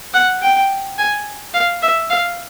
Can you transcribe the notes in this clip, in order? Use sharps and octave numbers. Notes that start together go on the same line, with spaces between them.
F#5
G5
G#5
F5
E5
F5